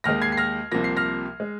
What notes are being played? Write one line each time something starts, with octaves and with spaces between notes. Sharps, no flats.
D#2 D#3 G#3 F6 A#6
G#6 C7
C7
F6 A#6
C2 C3 F3 A#3 A#6
C7
F6 A#6
G#3